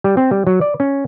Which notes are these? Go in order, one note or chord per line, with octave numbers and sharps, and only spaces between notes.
G3
C4
G3
F#3
D5
C#4